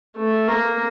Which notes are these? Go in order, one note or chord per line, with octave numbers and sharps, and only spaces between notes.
A3
A#3